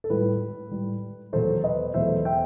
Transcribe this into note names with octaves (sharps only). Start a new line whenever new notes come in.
A4
A2 G3 B4
A2 G3
E2 B2 F#3 A3 A4 C5
B4 D#5
E2 B2 F#3 A3 C5 E5
E5 G5